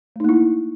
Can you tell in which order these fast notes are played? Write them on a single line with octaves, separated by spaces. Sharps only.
A3 D#4 A#3 E4